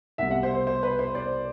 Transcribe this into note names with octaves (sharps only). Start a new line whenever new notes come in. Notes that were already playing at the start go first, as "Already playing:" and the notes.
C2 B2 G3 E5 F#5
E5 F#5
C5
C5
C5
B4
C5
C5 D5